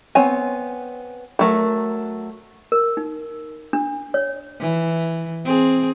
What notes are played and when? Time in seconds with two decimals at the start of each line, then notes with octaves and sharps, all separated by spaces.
0.15 B3 C4 C#5 G#5
1.39 F#3 A3 A#4
2.72 A#4
2.97 D#4
3.73 D4
4.14 C#5
4.60 E3
5.45 C4 G#4